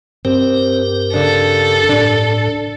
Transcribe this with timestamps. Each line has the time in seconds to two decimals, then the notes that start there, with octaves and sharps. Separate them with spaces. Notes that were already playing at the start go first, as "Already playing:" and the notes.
0.25 G2 C4 G4 A#4
1.14 C#3 D4 A4
1.89 A2 D4